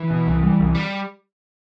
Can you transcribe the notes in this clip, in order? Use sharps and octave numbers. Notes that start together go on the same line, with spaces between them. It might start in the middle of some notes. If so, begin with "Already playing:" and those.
Already playing: E3
B2
C2
G3
C2
G3